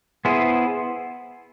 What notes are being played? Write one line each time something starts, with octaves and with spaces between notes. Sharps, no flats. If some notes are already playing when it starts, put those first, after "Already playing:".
B3 E4 G#4 C5